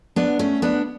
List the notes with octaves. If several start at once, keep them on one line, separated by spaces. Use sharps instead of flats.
B3 D4
A3 C#4
B3 D4